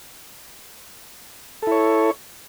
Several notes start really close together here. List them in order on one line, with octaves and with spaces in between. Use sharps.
A4 E4 C#5